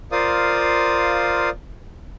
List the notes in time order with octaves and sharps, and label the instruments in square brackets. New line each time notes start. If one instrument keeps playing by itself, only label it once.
[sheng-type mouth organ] F4 A#4 C5 D5 F5 D#6